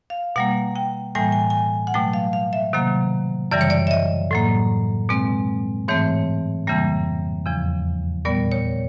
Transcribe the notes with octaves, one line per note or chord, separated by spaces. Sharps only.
F5
B2 G3 A#3 F#5
G5
A2 E3 G3 A#3 G#5
G#5
G#5
F#5
B2 F#3 A3 G5
F5
F5
E5
C3 D#3 F#3 A#3
F#2 C#3 E3 G3 D5
C#5
D5
E5
D#5
A2 F#3 A#3
B2 G#3 C4
G#2 E3 A3 C4 C#5
F2 C#3 E3 G3 A#3
E2 C#3 F3
A#2 G3 B3 D5
C#5